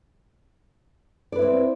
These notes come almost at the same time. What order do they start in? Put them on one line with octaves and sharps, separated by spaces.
D5 B4 E4 C4